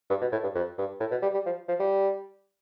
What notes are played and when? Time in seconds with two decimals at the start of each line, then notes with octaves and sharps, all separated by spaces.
0.10 G2
0.21 B2
0.32 A2
0.43 G2
0.55 F2
0.78 G2
1.00 A2
1.11 B2
1.23 G3
1.34 G3
1.46 F3
1.68 F3
1.80 G3